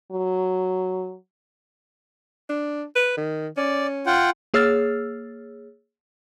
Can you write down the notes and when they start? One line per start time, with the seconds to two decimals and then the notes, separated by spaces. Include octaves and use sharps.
0.12 F#3
2.49 D4
2.96 B4
3.17 D#3
3.57 C#4 D5
4.06 F4 F#5 G5
4.54 A#3 G#4 C#5 E6 F6 A6